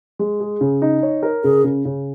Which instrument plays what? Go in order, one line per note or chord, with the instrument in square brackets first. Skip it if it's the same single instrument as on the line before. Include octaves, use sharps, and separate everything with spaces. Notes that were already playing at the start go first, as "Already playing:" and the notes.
[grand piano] G#3
G#4
C#3
D#4
C#5
A#4
[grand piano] C#3 [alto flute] G#4
[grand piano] C#3
C#3